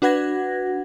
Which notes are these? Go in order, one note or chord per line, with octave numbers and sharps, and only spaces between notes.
D4 F#4 B4 F#5 G#6 A#6